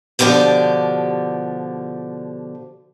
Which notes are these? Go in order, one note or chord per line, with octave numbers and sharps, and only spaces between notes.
B2 D3 F3 G4 D5